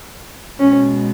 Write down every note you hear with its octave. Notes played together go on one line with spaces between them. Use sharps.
B2 G#3 C#4